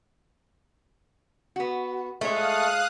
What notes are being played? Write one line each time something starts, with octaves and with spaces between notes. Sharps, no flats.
B3 F#4
A#2 G#3 A3 C#5 F5 D#6 F#6